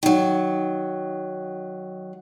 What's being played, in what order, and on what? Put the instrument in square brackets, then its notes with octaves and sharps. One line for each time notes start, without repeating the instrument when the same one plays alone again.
[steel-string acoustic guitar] D#3 F#3